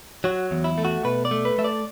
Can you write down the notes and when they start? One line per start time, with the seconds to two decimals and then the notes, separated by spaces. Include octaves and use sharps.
0.24 F#3 F#4
0.51 E2
0.64 E4
0.78 A3
0.85 F#4
1.04 B2 B4
1.25 D5
1.31 A3
1.45 B4
1.58 A3 E5
1.64 D5